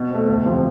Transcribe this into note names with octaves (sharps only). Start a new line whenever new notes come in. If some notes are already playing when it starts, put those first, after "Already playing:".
Already playing: B2
A3 C4
D2
C3 F3